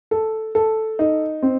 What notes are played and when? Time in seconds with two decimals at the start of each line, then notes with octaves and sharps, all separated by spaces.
0.11 A4
0.55 A4
0.99 D#4
1.42 C4